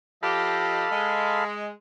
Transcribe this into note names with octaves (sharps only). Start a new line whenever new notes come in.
F3 G4 A4 D#5 F5 B5
G#3